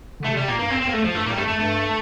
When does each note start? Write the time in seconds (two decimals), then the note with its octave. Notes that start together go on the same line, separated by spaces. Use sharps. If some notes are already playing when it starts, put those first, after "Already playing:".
0.20 D3
0.25 C3 A3
0.37 C3 G3
0.48 A#2 A#3
0.59 G2 A#3
0.70 F2 C4
0.81 C4
0.85 E2 A#3
0.93 A3
1.00 F2
1.04 F3
1.14 G2 A3
1.26 A2 A#3
1.31 G3
1.37 G2 A3
1.47 F2 A3
1.59 G2 A3